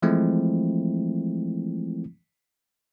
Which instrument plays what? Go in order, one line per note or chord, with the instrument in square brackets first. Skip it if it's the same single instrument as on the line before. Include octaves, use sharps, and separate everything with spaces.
[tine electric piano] E3 F3 G#3 A3 C4 E4